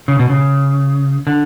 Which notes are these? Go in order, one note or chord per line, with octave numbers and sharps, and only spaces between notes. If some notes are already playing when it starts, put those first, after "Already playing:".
C#3
B2
C#3
D3